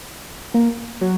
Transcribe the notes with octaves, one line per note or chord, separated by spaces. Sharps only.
A#3
F#3